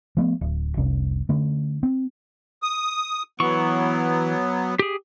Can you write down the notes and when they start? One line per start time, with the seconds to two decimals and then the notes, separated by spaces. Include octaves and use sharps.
0.17 F3 A3 B3
0.41 D1
0.77 F1 C2 C#4
1.29 D3 A3 C#4
1.83 C4
2.63 D#6
3.40 E3 F#3 B3 C#6
4.79 G4 G#4